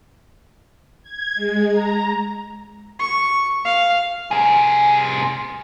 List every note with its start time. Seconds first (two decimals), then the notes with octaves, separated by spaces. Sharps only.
1.02 G#6
1.35 G#3
1.70 A#5
2.99 C#6
3.65 F5
4.31 C3 G#4